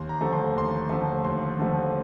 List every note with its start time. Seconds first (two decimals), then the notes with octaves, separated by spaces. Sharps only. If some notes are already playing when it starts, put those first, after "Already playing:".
Already playing: D#2 C6
0.09 A#5
0.21 D3 F3 A3
0.33 C6
0.55 D#2 C6
0.89 D3 F3 A3
1.24 D#2 C6
1.58 D3 F3 A3